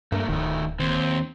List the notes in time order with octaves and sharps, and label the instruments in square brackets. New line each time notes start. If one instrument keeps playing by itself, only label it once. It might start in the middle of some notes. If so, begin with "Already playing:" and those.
[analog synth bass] G2 [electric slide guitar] A3 A#3
[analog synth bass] D1 [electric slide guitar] D#3 A3
[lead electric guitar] D#2 [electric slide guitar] C4